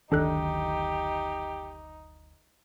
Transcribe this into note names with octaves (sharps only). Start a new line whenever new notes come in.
F#1 D2 D#3 D4 D#4 G4 A4 F#6